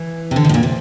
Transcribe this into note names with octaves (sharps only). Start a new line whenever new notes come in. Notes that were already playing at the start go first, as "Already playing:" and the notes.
Already playing: E3
C3
D3
C3
A2
A#2
C3